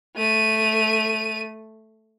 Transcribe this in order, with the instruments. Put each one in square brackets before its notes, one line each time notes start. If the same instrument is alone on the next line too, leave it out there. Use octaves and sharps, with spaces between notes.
[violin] A3 D#7